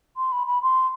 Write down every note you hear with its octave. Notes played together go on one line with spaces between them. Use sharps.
C6
B5
B5
C6